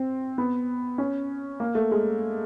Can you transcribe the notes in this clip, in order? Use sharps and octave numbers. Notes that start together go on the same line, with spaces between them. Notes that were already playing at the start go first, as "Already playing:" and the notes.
Already playing: C4
B3
C#4
A#3
A3
G#3